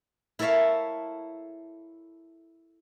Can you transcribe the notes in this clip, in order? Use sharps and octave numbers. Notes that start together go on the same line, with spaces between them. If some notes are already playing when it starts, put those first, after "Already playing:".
E4 A4 A#4 C#5 E5 F5